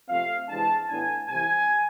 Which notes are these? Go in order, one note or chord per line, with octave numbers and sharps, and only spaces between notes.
C3 F3 A3 C4 F5
C3 E3 G#3 D4 A5
A2 E3 B3 D4 G#5
C2 C3 E3 G#5